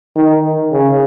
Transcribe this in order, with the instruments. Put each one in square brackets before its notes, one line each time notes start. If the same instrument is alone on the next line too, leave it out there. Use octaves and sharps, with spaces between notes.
[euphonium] D#3
C#3